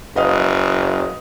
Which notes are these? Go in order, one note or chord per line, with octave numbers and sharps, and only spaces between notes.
F#1 B4 D#5 F5